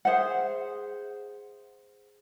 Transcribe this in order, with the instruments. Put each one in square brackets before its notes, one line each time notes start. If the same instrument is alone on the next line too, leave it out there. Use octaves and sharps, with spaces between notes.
[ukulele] G#4 C5 E5 F#5